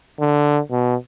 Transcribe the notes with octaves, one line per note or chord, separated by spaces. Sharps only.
D3
B2